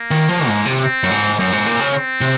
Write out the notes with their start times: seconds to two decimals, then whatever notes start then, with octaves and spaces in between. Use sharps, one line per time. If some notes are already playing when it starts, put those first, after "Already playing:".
Already playing: A#3
0.11 D#3
0.29 F3
0.47 G#2
0.65 C3
0.83 C4
1.03 F#2
1.11 G#2
1.39 F#2 C4
1.52 G#2
1.66 A#2
1.80 C#3
1.94 C4
2.21 C3